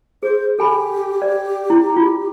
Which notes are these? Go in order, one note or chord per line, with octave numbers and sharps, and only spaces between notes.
G#4 C5
G4 A4 G#5 B5
D5
E4
F4